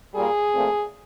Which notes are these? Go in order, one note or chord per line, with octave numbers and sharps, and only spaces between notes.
A#2 G3 A#3 G#4
A#2 F3 A3 C4